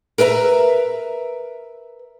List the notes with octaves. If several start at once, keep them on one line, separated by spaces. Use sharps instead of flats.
A#4 B4 E5 A5 A#5